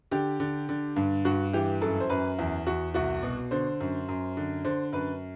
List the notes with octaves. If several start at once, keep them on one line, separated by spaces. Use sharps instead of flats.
D3 G4
D3
D3
G2
G2 F#4
E3 G4
F#2 A4
C5
F#2 B4
E2
E2 F#4
C2 F#4
B2
D3 C5
F#2
F#2
D3
D3 C5
F#2 B4